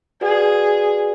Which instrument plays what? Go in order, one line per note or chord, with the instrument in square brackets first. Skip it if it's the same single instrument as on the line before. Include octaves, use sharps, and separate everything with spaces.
[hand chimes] F#4 B4 D5 F#5 [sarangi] G#4